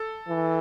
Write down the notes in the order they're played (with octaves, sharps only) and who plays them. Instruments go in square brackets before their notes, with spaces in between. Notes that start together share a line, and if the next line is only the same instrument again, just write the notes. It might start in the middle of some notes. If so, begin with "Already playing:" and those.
Already playing: [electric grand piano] A4
[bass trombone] E3